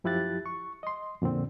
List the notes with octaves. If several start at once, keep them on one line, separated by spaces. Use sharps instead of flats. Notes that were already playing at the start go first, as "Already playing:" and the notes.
F#2 F3 E4 G4 F#6 A6
C#6
D#5 C6
F2 A#2 D3 C4